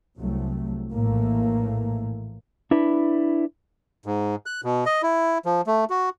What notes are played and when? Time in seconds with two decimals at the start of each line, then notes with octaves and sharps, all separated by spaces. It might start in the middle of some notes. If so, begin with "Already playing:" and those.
0.18 C2 F#3 A3
0.92 A#1 A2 E3 A3 A#3
2.71 D4 E4 B4
4.06 G#2
4.46 F#6
4.64 B2
4.86 D#5
5.03 E4
5.45 F3
5.67 A3
5.90 F#4